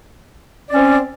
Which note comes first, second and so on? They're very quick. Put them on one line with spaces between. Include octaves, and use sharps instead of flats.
D5 C#4 C4